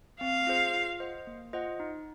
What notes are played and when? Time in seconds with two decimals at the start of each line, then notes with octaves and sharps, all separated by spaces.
0.21 C4 F5
0.47 F4 G#4 C5
0.74 F4
1.00 C5 D#5 F#5
1.27 A#3
1.53 F4 C5 D#5 F#5
1.80 D#4